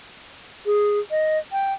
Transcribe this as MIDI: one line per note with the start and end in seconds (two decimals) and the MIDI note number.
0.66 0.99 68
1.11 1.38 75
1.52 1.73 79